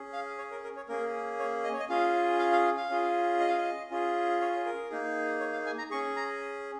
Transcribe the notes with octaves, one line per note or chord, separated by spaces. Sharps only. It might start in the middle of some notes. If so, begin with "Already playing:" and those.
Already playing: C#4 G#4
F5
C#5
A#4
A#4
C#5
A#3 C#4 G#4 A#4
C#5
D#5
C#5
D#5
C#4 F4 G#4 F5
F5
F5
F5
C#4 F4 G#4
D#5
F5
D#5
C#4 F4 G#4
C#5
A#4
A#3 D#4 G#4
C#5
F5
G#5
A#5
C#4 G#4 C#6
A#5